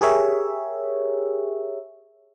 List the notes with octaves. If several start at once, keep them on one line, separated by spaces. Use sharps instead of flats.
G4 G#4 A#4 C#5 E5